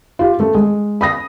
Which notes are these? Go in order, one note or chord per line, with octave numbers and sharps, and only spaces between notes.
F4 G4
A3
G#3
B5 D#6 A#6